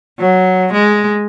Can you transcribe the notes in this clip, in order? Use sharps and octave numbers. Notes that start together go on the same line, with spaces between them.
F#3
G#3